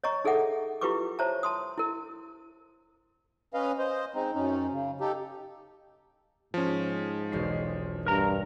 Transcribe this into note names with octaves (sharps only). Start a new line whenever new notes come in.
C#5 D#5 A#5 C#6
D#4 G#4 A4 E5 F#5 D6
E4 F4 G4 B4 C#6 D6
C5 C#5 E5 A5 A#5
A5 C6 D#6
E4 A#4
C#4 B4 D#5 F5
C5 D#5
G#3 C4 D#4
F#2 C#4 D#4
C#3
D#4 G4 A4
G#2 F3 C#4
E1 B1 C7
G2 A#4 A#5